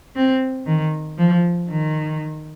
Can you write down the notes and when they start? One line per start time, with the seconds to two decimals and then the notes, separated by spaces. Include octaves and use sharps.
0.16 C4
0.66 D#3
1.18 F3
1.70 D#3